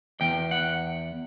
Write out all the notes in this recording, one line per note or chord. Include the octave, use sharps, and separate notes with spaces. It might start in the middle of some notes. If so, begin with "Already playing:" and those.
E2 G5
F#5